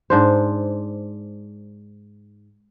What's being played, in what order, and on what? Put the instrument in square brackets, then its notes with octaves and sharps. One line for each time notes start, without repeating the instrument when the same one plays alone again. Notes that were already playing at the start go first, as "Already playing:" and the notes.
[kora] G#2 D4 C5